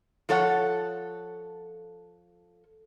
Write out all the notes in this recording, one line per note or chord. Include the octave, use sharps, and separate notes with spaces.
F3 A4 C#5 F#5